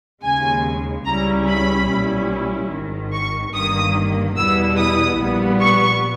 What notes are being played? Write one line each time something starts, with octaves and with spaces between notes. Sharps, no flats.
D#2 C#3 G#3 G#5
C#2 C#3 G3 C#4 E4 A#5
B5
B1 A#2 G3 C#4 E4
G#1 G#2 D#3
C#6
G1 G2 D#3 A#3 D#6
E2 B2 G3 B3 E4 E6
D#6
A#1 A#2 G3 B3
C#6